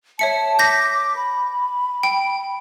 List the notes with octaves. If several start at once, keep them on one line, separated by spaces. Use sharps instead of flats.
C#5 E5 A5 C#7
D6 G6 A#6 B6
D6
B5
G5